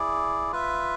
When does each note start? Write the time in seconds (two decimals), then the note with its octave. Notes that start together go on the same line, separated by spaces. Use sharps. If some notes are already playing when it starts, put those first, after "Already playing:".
Already playing: E4 G#4 D5
0.52 F4 B4 E5